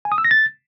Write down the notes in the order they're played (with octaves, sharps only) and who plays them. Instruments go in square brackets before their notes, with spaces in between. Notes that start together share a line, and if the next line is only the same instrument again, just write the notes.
[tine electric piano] G#5
D#6
E6
A#6
A6